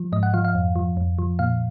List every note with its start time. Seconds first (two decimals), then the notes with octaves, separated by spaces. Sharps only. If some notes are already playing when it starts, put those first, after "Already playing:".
Already playing: F3
0.12 G#2 D#5
0.23 F#5
0.34 F3 F5
0.45 F5
0.55 F2
0.76 F3
0.97 F2
1.19 F3
1.39 A#2 F5